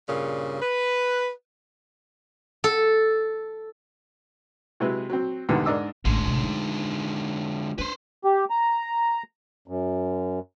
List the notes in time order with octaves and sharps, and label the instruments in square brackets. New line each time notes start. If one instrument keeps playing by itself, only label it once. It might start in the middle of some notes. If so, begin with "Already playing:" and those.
[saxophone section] G2 A#2 C#3
B4
[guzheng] A4
[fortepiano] C3 F#3 G#3 E4 B4
F#3 C4
E2 G#2 D3 D#3 G3 B3
G#2 D4 A#4 D#5 D6 E6
[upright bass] A1 [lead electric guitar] D3 G#3
[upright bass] G#1 C3
D#4
[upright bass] D4 [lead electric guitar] B4 C5
[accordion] G4
A#5
F#2